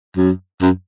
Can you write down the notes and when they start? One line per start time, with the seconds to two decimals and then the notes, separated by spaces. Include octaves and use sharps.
0.17 F#2
0.62 F#2